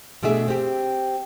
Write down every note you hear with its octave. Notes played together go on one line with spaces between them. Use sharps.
B2 A3 D4 G#4 E5
C4 G4